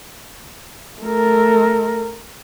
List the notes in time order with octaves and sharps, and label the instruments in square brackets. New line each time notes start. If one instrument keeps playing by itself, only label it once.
[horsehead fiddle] A3 A#4